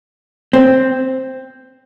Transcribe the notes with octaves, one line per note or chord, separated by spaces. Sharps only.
C4